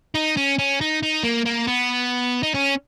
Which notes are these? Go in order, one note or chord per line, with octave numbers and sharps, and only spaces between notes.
D#4
C#4
C#4
D#4
D#4
A#3
A#3
B3
D#4
C#4